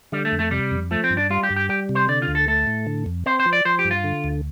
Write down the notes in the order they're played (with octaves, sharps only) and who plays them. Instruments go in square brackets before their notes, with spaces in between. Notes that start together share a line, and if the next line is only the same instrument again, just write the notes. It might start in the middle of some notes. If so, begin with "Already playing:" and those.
[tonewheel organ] D3 [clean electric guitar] G3
[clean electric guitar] A3
[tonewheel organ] F2
[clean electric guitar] A3
[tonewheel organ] C3 [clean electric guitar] G3
[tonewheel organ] F2
[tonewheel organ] F3 [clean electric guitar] A3
[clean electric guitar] C4
[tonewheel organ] G2
[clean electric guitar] D4
[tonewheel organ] G3 [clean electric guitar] F4
[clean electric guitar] G4
[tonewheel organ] G2
[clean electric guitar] G4
[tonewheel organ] G3 [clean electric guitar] G4
[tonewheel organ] C3
[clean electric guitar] C5
[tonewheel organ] D3 [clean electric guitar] D5
[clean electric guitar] F4
[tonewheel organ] D2
[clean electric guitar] A4
[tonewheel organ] A3 [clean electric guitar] A4
[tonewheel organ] A2
D3
F2
[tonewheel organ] C4 [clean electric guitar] C5
[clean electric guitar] C5
[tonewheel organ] F3
[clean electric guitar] D5
[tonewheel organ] F3 [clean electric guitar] C5
[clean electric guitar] G4
[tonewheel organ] G2
[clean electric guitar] F4
[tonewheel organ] D3
D2